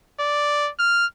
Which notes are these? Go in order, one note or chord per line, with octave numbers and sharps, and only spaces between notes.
D5
F6